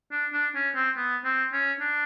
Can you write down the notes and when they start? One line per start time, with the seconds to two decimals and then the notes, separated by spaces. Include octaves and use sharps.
0.12 D4
0.33 D4
0.55 C#4
0.75 C4
0.97 B3
1.25 C4
1.53 C#4
1.81 D4